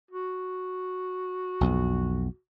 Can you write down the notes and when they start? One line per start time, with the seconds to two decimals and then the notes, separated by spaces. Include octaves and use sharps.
0.11 F#4
1.61 B1 F2